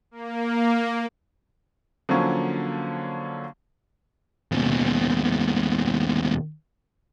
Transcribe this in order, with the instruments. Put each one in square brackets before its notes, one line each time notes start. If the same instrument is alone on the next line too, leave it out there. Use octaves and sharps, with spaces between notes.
[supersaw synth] A#3
[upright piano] D3 F3 F#3 A#3 C#4
[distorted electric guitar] D#2 B2